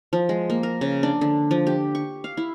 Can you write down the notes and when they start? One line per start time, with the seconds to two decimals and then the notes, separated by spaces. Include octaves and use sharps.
0.13 F3
0.29 G#3
0.50 A#3
0.63 A#4
0.81 C#3
1.03 D4
1.21 D3
1.51 F3
1.67 G4
1.95 C#6
2.24 F5
2.37 E4